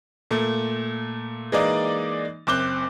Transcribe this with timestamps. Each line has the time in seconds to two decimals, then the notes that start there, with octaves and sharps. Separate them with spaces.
0.31 A#2 A3
1.52 E3 G#3 A#3 D#4 D5 D#5
2.47 F#1 C4 D6 F#6 G7